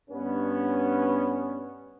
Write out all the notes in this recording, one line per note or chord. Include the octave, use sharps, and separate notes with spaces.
G2 B3 C#4